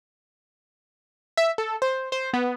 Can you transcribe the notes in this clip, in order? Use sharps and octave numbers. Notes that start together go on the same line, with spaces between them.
E5
A4
C5
C5
B3